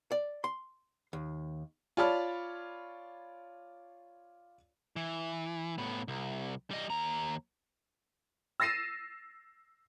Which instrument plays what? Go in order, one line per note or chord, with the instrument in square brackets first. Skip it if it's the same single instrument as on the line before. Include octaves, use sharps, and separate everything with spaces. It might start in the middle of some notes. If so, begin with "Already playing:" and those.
[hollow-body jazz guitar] D5
C6
D#2
[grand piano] F4 C#5 D5 A5 B5 F6
[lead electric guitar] E3
A2 B3
C2
G3 D#5
D#2 A#5
[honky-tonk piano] E6 A6 A#6 C7 D#7 E7